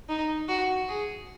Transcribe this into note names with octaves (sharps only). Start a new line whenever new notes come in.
D#4
F#4
G#4